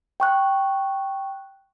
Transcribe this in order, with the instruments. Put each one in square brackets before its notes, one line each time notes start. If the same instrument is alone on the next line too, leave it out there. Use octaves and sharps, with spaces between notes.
[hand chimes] G5 C#6 F#6